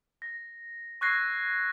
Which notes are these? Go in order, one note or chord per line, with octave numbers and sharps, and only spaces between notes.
A#6
C#6 E6 F#6 G#6 A#6 C7